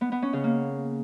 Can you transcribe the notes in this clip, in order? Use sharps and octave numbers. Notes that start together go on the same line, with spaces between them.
B3
B3
C#4
C#3
A#3